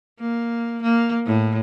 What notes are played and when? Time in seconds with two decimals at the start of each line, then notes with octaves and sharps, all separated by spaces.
0.20 A#3
0.82 A#3
1.26 A2